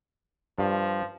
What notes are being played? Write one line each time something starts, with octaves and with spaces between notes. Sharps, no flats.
G2 F3